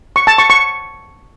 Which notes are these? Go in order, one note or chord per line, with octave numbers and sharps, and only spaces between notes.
C#6
A5
C#6
C#6